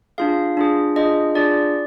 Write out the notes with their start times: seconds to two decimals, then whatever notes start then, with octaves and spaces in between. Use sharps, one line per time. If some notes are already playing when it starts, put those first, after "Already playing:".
0.18 D4 F4 G#4 F5
0.57 D4 F4 G#4
0.96 D4 F4 G#4 D#5
1.35 D4 F4 G#4 D5